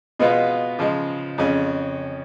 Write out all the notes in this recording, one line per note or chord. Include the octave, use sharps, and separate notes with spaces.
B2 G#3 B3 F4 B4
C#3 F3 G#3
F2 C#3 G#3 C#4